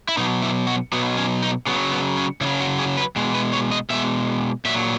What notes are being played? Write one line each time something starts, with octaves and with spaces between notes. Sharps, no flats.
E4
B2 F#3 D#4
E4
F#4
B2 F#3 B3
C#4
D#4
C#3 F#3 B3
B3
C#4
C#3 E4
F#3
F#4
G#4
B4
B2 G#3
B4
C#5
D#5
B2 G#3 E5
A#2 F#3 E5